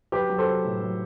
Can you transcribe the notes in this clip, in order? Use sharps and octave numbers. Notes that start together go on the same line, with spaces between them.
F#3 G4 B4
F#3
A4 C5
F#3
A2
F#3